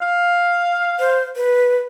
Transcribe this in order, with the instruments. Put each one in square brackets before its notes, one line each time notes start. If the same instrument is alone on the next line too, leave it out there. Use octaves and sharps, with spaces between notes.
[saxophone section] F5
[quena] C5
B4